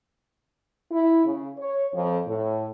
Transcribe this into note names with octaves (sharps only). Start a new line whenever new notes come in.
E4
C#3
C#5
F2
A2